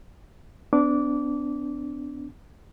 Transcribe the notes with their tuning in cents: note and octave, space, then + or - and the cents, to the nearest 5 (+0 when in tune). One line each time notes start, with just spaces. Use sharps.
B3 +45 D4 -5 D6 -20